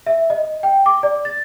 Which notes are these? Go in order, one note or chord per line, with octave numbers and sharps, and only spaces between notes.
E5
D#5
G5
D6
D5
A6